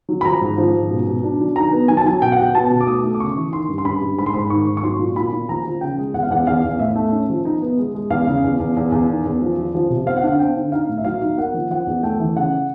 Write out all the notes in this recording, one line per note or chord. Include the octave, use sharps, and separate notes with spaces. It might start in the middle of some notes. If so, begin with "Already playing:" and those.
F#3
B5
F3 A#5
G#2
F3
G#2
B2
B2
D4
F#3
D#3 A#5
B3
F#3 G#5
A5
F#3 G#5
B2 G5
F#5
B2 G5
B3 A5
B2
D6
A3 D#6
A3
D6
C#3 C#6
E3
D#3 C6
G2
C6
G2 B5
G2
G#2 B5
C6
G#2 B5
D#3 C#6
G#2
C#6
F#3 C6
A#2
A#2 B5
A#2
F3 A#5
F3
C#3 G5
G#3
E2 F#5
F5
E2 F#5
E2 F5
E2
F5
A2 E5
A3
C#4
F3
D#4
B3
G#3
G#3
E2 F5
C#3
E2
E2
E2
E2
D#3
E2
F3
F3
F3
C3
C4 F5
F#5
D3 F5
C4 G5
D3
D#4 F5
A2
E5
F#3 F5
D#4
A#3 F#5
F3
F3 F#5
E2
A3 G5
E3
C#3 F#5